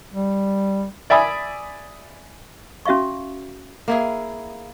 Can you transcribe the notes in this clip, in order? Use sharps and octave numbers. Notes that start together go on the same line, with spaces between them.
G3
D5 E5 G#5 B5 D#6
C#4 F#4 E5 F5 C#6
A#3 E4 G#4